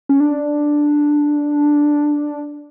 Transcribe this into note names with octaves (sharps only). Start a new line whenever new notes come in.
C#4
D4